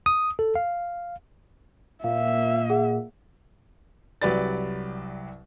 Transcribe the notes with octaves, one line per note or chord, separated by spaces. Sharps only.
D#6
A4
F5
A#2 A#3 E5 F5
G#4 F#5
C2 F#3 G4 B4 D5 A6